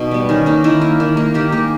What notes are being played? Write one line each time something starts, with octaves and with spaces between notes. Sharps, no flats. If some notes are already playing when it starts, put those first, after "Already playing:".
Already playing: B2 D#4
G3 B3
D#3 C#4
A#3 D#4
D#3 E4
A#3
D#3
A#3
D#3 G4
A#3 G#4